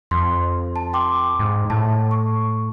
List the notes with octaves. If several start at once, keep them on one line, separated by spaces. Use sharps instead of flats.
F2 C6
A5
G5 C6 D6
G#2
A2 A5
C#6